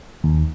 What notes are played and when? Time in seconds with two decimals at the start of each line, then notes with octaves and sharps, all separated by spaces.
0.24 D#2